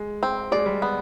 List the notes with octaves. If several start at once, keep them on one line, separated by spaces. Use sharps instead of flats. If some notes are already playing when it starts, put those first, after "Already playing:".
Already playing: G#3
C4
G#3 D5
G3
B3